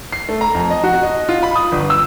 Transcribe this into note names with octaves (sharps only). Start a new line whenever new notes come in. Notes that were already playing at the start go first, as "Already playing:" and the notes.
C7
A3
A#5
F2
D#5
F#4
D#5
F4
B5
D#6
G1
E6